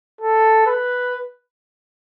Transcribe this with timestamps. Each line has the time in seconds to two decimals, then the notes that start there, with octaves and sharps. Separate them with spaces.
0.21 A4
0.67 B4